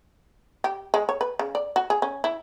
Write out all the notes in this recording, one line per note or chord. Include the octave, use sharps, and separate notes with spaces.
G4
G#3
C#5
B4
C#3
D5
F#4
G#4
C#4
E4